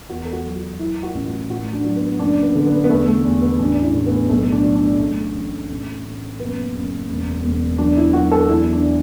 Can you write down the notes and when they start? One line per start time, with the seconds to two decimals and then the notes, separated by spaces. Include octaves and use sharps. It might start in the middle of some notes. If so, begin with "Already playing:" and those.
0.10 E2 F#4
0.25 A4
0.33 F#4
0.45 F#3
0.56 F#4
0.79 F#3 E4
1.03 F#4
1.15 A1
1.26 F#4
1.49 A2 F#4
1.73 D4
1.84 F#3
1.96 B3
2.19 F#1 D4
2.43 B3
2.55 D3
2.66 B3
2.84 B3
2.90 E2 A3
3.06 A3
3.24 E2
3.42 B3
3.59 A1 D4
3.82 E4
3.94 A2
4.06 B3
4.29 B1 A3
4.52 D4
4.64 F#3
4.75 D4
4.99 A1 A3
5.34 A1
5.69 A1
6.04 A1
6.40 F#1 B3
6.75 F#1
7.09 E1
7.44 E1
7.78 F#3 D4
7.97 E4
8.13 F#3 F#4
8.32 A4
8.48 E2 E4
8.73 D4